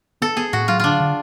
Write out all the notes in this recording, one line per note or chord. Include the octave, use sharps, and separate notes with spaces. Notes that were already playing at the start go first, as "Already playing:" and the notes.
B3 A4
B3 G#4
A2 F#4
F#3 F4
D3 D4 F4
D3